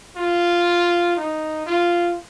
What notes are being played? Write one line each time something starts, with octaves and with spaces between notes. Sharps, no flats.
F4
D#4
F4